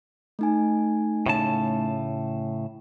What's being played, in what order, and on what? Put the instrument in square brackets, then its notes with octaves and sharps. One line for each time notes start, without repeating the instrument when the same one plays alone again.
[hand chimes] A3 D#4 G#5
[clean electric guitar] A2 C#3 A5